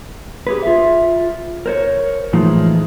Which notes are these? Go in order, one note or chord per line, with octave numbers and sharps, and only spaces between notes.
G4 G#4 B4
F4 E5
A#4 C5 C#5
A2 E3 F3 G#3 D#4 F4